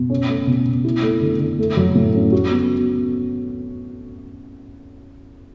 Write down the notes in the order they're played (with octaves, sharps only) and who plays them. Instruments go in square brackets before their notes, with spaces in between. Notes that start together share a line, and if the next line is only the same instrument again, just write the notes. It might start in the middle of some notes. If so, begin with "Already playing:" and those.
Already playing: [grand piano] B2
C#4
A3
B2
B2
E4
A3
D3
D3
A3
F#3
A2
C#4
F#4
B3